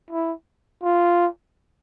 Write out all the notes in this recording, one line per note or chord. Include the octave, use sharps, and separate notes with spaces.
E4
F4